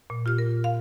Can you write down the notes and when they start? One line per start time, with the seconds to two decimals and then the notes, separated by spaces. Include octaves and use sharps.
0.10 A#2
0.26 F4 G4 F6
0.38 A#4
0.64 F5